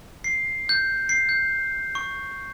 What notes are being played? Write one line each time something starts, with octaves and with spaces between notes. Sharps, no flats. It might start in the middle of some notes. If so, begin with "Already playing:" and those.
C7
G6
C7
G6
C#6